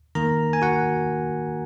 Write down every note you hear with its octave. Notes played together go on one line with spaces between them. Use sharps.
D#3 A#3 A#4 A#5
G#5
F#4 F#5